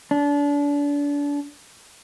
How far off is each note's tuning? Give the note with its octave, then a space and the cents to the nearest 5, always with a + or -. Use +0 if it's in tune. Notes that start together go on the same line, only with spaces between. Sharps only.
D4 -30